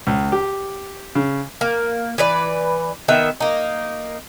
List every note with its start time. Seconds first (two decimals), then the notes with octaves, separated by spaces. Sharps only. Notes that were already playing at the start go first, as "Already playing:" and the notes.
0.07 C#2
0.32 G4
1.15 C#3
1.61 A#3
2.18 E3 B4 D5
3.08 D#3 B3 E5
3.40 A#3 D#4